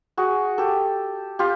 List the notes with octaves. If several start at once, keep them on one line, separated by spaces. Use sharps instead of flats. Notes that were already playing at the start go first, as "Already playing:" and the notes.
F#4 G#4
G4 A4
F4 G4